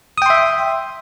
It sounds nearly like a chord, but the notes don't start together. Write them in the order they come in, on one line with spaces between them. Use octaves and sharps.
D#6 G5 C6 E5